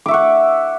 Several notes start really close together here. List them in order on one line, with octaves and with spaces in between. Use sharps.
D6 E5 C#6 F#5